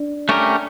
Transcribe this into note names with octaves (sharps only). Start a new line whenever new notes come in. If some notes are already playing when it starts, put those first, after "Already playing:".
Already playing: D4 D5
A3 C#4 G4 A#4